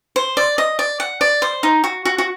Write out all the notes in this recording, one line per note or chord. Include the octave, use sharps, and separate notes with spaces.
C5
D5
D#5
D5
F#5
D5
C5
D#4
F#4
F#4
F#4